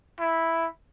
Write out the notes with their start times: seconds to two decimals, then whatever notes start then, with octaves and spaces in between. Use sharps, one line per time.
0.20 E4